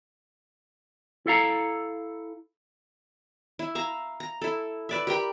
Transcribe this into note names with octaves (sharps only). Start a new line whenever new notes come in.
E4 A4 F5 A#5
E4
E5 F5 A#5
A#5
E4 A4
B4 D5 E5
G4 A#4 G5 B5